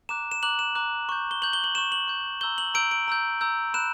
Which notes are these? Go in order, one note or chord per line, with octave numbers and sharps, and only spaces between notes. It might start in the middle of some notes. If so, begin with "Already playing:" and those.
A#5 D6 F#6 E7
E7
A#5 D6 F#6 F#7
E7
A#5 D6 F#6
C#6 G6
G7
C#6 G6 F#7
G7
F#7
C#6 G6 E7
F#7
C#6 G6
A#5 E6 G6 G7
F#7
A#5 E6 G6 D7
D7
A#5 E6 G6
A#5 E6 G6
B5 F#6 E7